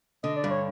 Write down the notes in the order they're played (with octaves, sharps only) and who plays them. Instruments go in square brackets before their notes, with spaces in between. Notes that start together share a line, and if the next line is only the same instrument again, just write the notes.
[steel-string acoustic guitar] D3 [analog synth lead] D#5
[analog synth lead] D5
[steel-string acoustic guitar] G2
[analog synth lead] C#5